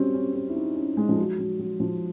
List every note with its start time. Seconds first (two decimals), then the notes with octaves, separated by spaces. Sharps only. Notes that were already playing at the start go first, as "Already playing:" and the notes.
Already playing: F#3 G3 C4 C#4
0.14 C#4
0.35 C4
0.49 E4
0.56 D#4
0.76 C#4
0.97 G#3
1.09 F3
1.17 F#3
1.39 F#3
1.59 F#3
1.80 F3